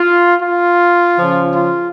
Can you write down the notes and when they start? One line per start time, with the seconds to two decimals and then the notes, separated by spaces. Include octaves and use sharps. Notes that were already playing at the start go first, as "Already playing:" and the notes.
Already playing: F4
0.41 F4
1.17 C#3 F3 C#4
1.54 F4